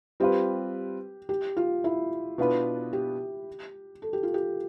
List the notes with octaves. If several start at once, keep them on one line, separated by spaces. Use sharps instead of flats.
G3 C4 F4 G4 B4
G4
F4
E4
B2 B3 D4 E4 F4 B4
G4
A4
G4
F4
G4